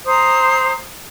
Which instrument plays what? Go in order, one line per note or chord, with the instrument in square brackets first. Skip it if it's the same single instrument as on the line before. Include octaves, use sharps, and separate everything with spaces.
[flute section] C5 A#5 D#6